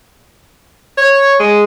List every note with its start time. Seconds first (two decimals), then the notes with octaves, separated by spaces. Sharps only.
0.98 C#5
1.40 G#3